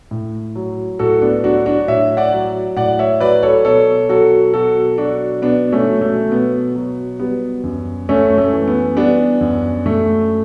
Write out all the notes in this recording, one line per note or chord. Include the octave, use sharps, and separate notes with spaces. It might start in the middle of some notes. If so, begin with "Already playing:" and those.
A2
F#3
A2 F#4 A4
B3 D4
F#3 D4 F#4
D4 F#4
A2 C#5 E5
D5 F#5
F#3
A2 D5 F#5
C#5 E5
F#3 B4 D5
A4 C#5
B2 A4 C#5
F#3 F#4 A4
B2 F#4 A4
F#3 D4 F#4
B2 B3 D4
A3 C#4
F#3
A3
B2 B3
F#3
G3 B3
F#2
F#2 A3 C#4
A3
E3
B3
G3 B3 D4
F#2
F#2 A3